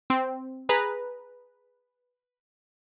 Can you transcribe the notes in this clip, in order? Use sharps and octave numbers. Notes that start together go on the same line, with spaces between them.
C4
G#4 B4 A#5